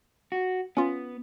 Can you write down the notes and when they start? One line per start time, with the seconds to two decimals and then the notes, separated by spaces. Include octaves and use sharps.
0.32 F#4
0.77 B3 C#4 F4